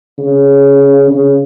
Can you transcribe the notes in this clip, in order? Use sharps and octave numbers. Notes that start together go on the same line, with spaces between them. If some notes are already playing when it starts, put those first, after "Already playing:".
C#3
C#3